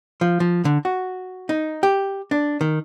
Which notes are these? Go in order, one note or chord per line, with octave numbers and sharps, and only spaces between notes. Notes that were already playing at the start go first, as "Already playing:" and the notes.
F3
F3
D3
F#4
D#4
G4
D4
D#3